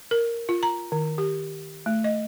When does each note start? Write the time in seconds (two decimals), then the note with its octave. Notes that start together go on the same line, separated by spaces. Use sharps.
0.11 A#4
0.49 F4
0.63 A#5
0.92 D#3
1.18 G4
1.86 A3
2.04 D#5